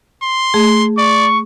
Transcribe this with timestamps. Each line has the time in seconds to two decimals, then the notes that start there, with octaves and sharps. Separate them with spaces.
0.22 C6
0.54 A3 G#4
0.98 D5 C#6